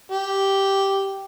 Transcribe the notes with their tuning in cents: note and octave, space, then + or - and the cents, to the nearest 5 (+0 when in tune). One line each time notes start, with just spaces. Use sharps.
G4 -5